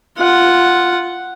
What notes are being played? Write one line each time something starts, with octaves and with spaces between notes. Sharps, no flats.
F4 F#5